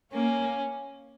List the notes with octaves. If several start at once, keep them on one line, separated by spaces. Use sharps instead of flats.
A#3 C#4